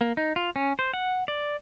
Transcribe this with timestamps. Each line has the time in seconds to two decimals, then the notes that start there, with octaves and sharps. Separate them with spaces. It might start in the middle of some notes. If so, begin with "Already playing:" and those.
0.01 A#3
0.17 D#4
0.36 F4
0.56 C#4
0.79 C5
0.94 F#5
1.28 D5